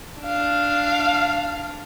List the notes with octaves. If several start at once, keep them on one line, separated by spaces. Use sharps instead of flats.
D4 F5